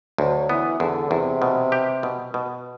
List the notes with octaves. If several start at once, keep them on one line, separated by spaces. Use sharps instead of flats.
D2 F#3
E3 B3
E2 D3
E2 C3
B2
G4
B2
B2